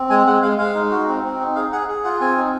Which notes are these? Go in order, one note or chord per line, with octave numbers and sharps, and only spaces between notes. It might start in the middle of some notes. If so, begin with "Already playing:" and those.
Already playing: C4
G#3 G#5
G#3 F#5
G#3 F5
G#3 F5
D#4
F#4
C4
C4
D#4
G#4 F5
G#4 F#5
G#4
F4 F#5
C4 G#5
D#4